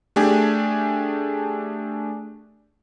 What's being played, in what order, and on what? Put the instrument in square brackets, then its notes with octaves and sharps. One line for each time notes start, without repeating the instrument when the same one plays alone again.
[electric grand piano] A3 D4 G4 G#4